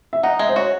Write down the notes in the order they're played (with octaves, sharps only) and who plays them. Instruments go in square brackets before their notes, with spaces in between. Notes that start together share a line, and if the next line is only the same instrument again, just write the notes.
[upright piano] E5
[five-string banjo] D#4 [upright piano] F#5
[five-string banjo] G#3 [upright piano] E5
[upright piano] C5
[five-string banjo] F#4 [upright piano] C#5